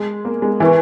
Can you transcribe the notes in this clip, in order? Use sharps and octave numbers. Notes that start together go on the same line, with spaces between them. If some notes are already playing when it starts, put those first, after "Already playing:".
Already playing: G#3
A#3
G#3
E3 E4 B4 E5 G#5 C#6